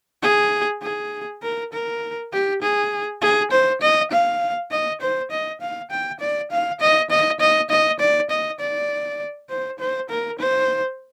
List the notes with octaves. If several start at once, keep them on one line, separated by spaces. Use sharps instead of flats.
G#4
G#4
A#4
A#4
G4
G#4
G#4
C5
D#5
F5
D#5
C5
D#5
F5
G5
D5
F5
D#5
D#5
D#5
D#5
D5
D#5
D5
C5
C5
A#4
C5